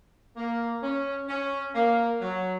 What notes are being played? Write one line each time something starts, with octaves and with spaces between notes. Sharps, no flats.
A#3
C#4
C#4
A#3
F#3